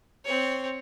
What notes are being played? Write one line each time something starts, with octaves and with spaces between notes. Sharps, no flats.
C4 C#5